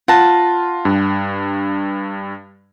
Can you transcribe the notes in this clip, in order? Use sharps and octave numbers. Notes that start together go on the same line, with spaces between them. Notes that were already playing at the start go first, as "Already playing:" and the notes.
F4 F#5 A5 A#6
G2